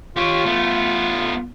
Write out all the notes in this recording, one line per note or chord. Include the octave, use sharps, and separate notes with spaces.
F4 G4 C#5
A3 B3